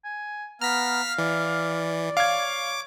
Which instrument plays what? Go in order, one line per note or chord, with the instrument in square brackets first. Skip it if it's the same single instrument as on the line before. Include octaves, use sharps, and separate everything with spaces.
[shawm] G#5
[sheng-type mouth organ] B3 A#5 [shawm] F5 [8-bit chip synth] F6 B6
[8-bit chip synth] E3 [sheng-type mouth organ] D5
[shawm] C#5 [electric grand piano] F5 G#6 [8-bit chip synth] D6